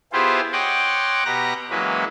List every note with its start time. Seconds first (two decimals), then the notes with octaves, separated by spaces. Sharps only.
0.13 B3 E4 F4 G4 G#4 C5
0.52 C#5 D#5 F#5 G5 C6 D6
1.25 B2 B3 G4 A#5 F#6 A#6
1.70 E3 F#3 G#3 A#3 C#4 B4